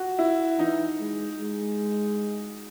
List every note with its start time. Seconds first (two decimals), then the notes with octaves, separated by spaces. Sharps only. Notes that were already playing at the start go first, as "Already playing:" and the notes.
Already playing: F#4
0.19 E4
0.59 E3 D#4
0.99 G#3
1.41 G#3